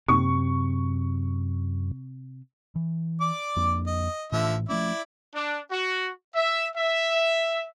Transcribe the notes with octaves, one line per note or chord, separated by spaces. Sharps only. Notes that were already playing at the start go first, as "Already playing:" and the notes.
F#2 C3 C#6
E3
D5 D6
F2 A#3 D4
D#5
A2 D3 E3 F3 E5
F3 A3 C#4 E4 D5 E5
D4
F#4
E5
E5